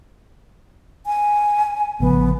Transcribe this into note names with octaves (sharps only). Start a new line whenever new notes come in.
G#5
A1 C#3 F3 B3